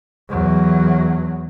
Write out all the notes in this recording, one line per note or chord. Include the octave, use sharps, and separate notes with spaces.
E2 F#3